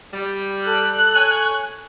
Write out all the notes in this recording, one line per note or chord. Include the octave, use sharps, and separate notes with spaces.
G3
A4 F#6
C#5 G#5